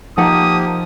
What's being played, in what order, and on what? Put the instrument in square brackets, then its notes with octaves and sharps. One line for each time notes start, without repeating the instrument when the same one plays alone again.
[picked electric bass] F3 [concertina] A#3 G4 [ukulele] D#4 F#5 A5 [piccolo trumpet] D#6